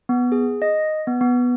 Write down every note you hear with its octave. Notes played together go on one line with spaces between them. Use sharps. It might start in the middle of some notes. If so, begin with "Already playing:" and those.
B3
G#4
D#5
B3
B3